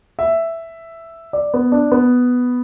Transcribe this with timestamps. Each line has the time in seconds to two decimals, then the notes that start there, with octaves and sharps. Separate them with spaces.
0.19 E5
1.33 D5
1.54 B3
1.72 D4
1.92 B3